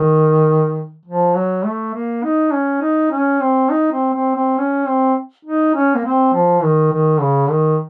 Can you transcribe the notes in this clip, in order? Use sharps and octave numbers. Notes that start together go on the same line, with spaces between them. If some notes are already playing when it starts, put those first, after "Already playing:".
Already playing: D#3
F3
F#3
A3
A#3
D#4
C#4
D#4
C#4
C4
D#4
C4
C4
C4
C#4
C4
D#4
C#4
A#3
C4
F3
D#3
D#3
C#3
D#3